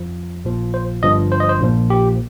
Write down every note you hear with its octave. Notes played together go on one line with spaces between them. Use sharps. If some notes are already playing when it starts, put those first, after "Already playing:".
Already playing: F2 F3
A#1 A#2 F3
C5
G1 G2 F3 D#5
C5
D#5
C5
A#1 A#2 F3
G4